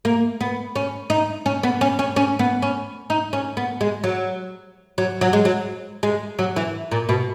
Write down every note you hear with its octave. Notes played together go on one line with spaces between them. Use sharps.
A#3
B3
C#4
D#4
C#4
B3
C#4
C#4
C#4
B3
C#4
D#4
C#4
B3
G#3
F#3
F#3
F#3
G#3
F#3
G#3
F#3
E3
A#2
B2